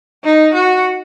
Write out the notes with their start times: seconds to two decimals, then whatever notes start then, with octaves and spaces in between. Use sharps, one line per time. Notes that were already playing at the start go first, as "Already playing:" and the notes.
0.25 D#4
0.54 F#4